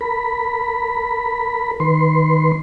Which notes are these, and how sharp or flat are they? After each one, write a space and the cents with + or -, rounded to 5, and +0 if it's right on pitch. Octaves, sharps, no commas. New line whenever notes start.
A#4 -20 B5 +0
D#3 +5 B4 +0 C6 +0